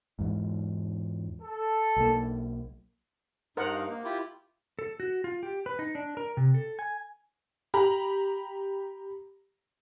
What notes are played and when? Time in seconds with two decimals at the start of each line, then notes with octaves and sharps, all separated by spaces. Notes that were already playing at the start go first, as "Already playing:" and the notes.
0.19 E2 G#2
1.41 A4
1.97 B1 A#3
3.57 G2 D#4 A#4 C5 F#5
3.75 F5
3.89 A#3
4.05 E4 F4 G4
4.79 A4
5.00 F#4
5.24 F4
5.43 G4
5.66 B4
5.79 D#4
5.95 D4
6.17 A#4
6.37 C3
6.54 A4
6.79 G#5
7.74 G4 A#5 B5